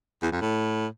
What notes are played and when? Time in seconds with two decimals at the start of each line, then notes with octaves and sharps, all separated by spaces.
0.23 E2
0.32 F2
0.41 A2